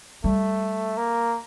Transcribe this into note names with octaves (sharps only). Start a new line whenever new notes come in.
G3 A3
A#3